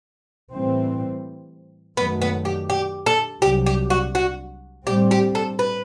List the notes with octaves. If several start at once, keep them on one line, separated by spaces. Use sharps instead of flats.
A2 E3 G3 C4
F#2 D#3 F#3 A3 B3
B3
G4
G4
A4
C2 C3 F#3 G4
G4
F#4
F#4
A2 G3 C4 G4
G4
A4
B4